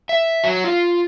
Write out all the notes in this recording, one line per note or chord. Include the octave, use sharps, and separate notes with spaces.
E5
F#3
F4